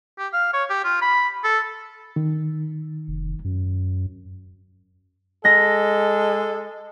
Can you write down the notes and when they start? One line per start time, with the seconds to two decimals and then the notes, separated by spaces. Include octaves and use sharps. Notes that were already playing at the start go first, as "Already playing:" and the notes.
0.19 G4
0.33 F5
0.53 C#5
0.70 G4
0.84 F4
1.02 B5
1.44 A4
2.16 D#3
3.08 F1
3.44 F#2
5.45 G#3 A4 A#6